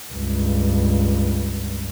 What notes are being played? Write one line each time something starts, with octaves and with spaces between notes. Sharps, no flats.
C#2 G2